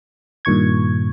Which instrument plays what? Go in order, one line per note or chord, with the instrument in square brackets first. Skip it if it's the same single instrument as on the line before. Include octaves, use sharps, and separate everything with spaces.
[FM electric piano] G2 A#2 D#3 C#6 G#6